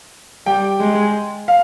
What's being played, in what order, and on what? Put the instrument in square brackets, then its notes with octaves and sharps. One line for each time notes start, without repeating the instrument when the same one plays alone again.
[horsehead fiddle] G3 [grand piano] G5
[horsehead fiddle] G#3
[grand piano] F5